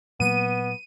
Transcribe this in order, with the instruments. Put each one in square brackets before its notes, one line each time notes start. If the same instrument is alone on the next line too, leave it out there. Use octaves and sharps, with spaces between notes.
[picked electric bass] A#2 F#3 A#3 [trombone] B3 [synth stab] D#7